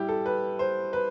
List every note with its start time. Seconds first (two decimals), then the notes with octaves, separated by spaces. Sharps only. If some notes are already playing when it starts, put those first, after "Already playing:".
Already playing: A2 G3 E4 G4
0.08 A4
0.26 B4
0.59 C5
0.93 B4